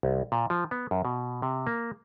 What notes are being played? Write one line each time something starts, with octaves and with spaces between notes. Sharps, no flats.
C2
A#2
F3
B3
F#2
B2
C3
A#3